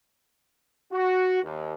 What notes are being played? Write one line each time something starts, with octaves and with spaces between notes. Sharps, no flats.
F#4
D#2